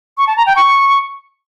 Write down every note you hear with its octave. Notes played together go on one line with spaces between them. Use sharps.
C#6
A5
A#5
G5
C#6